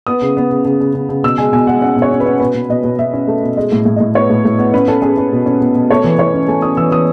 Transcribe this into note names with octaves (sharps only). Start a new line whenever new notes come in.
B3 D#6
C#3
B3
C#3
C#3
C#3
C#3
C#3
B2 E6
G#3 G#5
B2 G#5
G#3 F#5
C#4 F#5
B2
C#5
C#4
B4
C#4
B2 B4
B2
B2 D#5
B2
B2 E5
C#4
A3
B2
G#3 D#5
A2
A2
A2 D#5
B3 C#5
A2
A2
B3
C#4 B4
C#4 A4
C#4 G#4
C#4
B2
C#4
B2
B2
A3 C#5
E3
E3 C#5
C#4
A3 G#5
C#4 D#6
E3 E6
E3 D#6